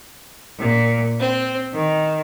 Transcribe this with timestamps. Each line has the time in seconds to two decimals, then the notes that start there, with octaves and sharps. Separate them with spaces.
0.59 A#2
1.20 C4
1.74 D#3